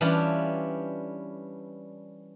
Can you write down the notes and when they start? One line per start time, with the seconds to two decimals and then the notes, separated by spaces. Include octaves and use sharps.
0.01 E3 G3 C#4 D4 E4 F4